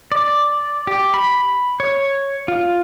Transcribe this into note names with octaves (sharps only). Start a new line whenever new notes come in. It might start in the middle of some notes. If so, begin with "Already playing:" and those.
D5
G4
B5
C#5
F4